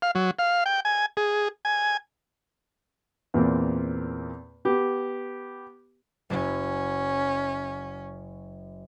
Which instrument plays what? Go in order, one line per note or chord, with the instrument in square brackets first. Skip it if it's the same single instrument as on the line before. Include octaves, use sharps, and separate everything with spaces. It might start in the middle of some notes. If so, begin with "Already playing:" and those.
[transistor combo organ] F5
F#3
F5
G5
G#5
G#4
G#5
[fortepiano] E2 A#2 A#3 C4
B3 G4
[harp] F#1 F#2 [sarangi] C#4